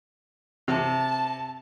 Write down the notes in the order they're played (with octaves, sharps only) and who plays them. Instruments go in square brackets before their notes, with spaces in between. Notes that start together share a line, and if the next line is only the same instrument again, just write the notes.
[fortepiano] C3 [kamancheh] A5